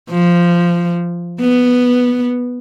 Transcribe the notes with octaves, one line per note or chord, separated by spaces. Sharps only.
F3
B3